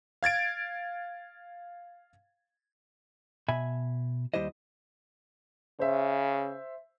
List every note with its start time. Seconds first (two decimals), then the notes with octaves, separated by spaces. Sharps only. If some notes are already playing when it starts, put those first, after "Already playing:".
0.23 F5 G#6 A6 D7
3.48 B2 E5 G#5 B5
4.34 D#2 G3 E4 G4 C5 D#5
5.80 C#3 C5 E5